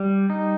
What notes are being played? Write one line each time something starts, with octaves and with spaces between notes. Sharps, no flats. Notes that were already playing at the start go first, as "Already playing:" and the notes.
Already playing: G3
D#4